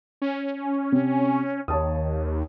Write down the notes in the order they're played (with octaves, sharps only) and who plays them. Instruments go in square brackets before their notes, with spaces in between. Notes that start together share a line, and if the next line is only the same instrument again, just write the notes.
[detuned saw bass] C#4
[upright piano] C3
[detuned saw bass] D#2 [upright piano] C#5 A5 D#6